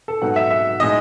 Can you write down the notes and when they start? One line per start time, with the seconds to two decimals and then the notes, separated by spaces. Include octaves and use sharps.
0.08 A4
0.21 G#2 F#3 B3 D#4 F#5
0.36 E5
0.51 E5
0.80 A2 G#3 D#4 D#5